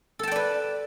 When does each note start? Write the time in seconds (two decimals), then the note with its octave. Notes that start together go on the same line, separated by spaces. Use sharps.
0.19 A4
0.23 A5
0.27 G5
0.32 D5
0.36 B4